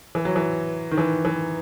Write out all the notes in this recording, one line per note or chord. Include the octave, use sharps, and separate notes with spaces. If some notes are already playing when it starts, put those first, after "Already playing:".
E3
F#3
E3
D#3
E3
E3